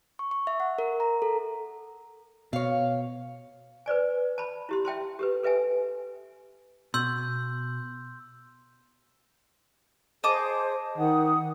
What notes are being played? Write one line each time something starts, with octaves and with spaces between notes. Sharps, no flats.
C#6
C#6
E5
F#5
A#4
A#5
A4
B2 C#5 F5
B4 C5 D5 G#5
A5 B5
E4 G4 C6
E5 G5 A5 C6
G4 A4 B4
A4 B4 E5 G5 G#5
B2 C6 E6 G6
G#4 C5 D#5 A5 D6
D#3 F#5 D#6